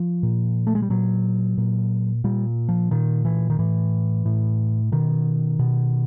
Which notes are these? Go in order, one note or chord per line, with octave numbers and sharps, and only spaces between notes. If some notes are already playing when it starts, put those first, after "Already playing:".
Already playing: F3
A#2
A3
G#3
G3
A#2 F#3
A#2
A#2 G3
F3
A#2 D#3
E3
D#3
A2 E3
A2
B2 D#3
B2